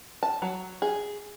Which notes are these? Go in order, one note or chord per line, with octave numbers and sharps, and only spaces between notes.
A5
F#3
G#4